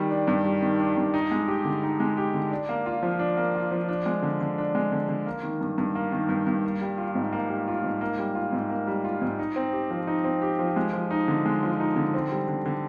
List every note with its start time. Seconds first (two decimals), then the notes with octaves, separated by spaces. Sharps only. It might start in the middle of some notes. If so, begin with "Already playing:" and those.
Already playing: D#3 G3
0.11 D4
0.27 G2
0.45 G3
0.62 D#3
0.80 D4
0.97 G2
1.14 D#4
1.31 G#3
1.48 G4
1.65 D3
1.83 D#4
2.00 G#3
2.17 G4
2.34 D3
2.51 D4
2.69 A#3
2.86 F4
3.03 F3
3.19 D4
3.37 A#3
3.55 F4
3.71 F3
3.88 D4
4.06 G#3
4.22 D3
4.41 D3
4.58 D4
4.75 G#3
4.92 D3
5.08 D3
5.26 A#3
5.43 D#3
5.61 G2
5.78 G2
5.95 A#3
6.12 D#3
6.29 G2
6.47 G2
6.64 A#3
6.81 G3
6.98 F4
7.15 G#2
7.33 A#3
7.49 G3
7.67 F4
7.84 G#2
8.01 A#3
8.19 G3
8.35 F4
8.52 G#2
8.69 A#3
8.87 G3
9.04 F4
9.22 G#2
9.39 D#4
9.56 C4
9.73 G4
9.91 F3
10.07 D#4
10.24 C4
10.42 G4
10.59 F3
10.76 G#3
10.93 F3
11.11 D#4
11.28 D3
11.45 G#3
11.63 F3
11.80 D#4
11.96 D3
12.14 C4
12.31 G3
12.48 D3
12.65 D3